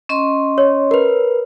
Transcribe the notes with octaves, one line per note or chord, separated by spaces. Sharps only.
C#4 D#5 C6
C#5
A#4 B4